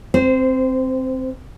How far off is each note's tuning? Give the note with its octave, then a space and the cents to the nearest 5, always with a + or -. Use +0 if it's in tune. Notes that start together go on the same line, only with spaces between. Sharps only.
C4 +0 C5 -20